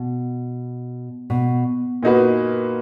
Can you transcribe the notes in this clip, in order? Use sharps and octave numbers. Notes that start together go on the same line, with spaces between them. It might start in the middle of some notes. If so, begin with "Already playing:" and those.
Already playing: B2
B2
A#2 A#3 D#4 F#4 B4